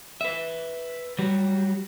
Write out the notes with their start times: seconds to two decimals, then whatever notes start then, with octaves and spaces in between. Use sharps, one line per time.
0.21 B4 E5
1.19 F#3 G3